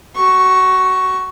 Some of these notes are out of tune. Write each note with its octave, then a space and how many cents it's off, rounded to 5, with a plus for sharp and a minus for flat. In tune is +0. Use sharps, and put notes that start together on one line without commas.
F#4 +25 C#6 +0